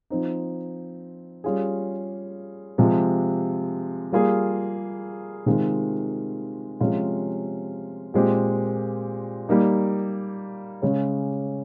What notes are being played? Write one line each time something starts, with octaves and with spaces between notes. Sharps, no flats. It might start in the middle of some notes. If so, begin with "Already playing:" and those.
F3 C4 D#4
G3 C#4 F4 G#4
C3 F3 G#3
G3 A#3 F4 G#4
C3 D#3 G#3 C4 F4
C3 F3 G#3 C#4 F4
A#2 G#3 C4 G4
G3 A#3 D#4
C#3 G#3 C#4